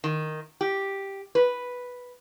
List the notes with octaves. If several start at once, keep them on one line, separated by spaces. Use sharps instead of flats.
D#3
G4
B4